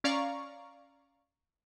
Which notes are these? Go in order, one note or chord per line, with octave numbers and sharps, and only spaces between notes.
C#4 D5 F5 A#5 C#6